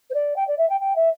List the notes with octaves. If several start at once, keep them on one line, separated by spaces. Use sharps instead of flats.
C5
D5
G5
D5
E5
G5
G5
E5